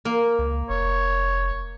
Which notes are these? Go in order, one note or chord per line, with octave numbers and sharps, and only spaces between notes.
A#3
C#2
F1 C#5